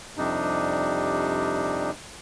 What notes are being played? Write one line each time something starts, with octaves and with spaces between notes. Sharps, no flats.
F2 C3 G3 D4 D#4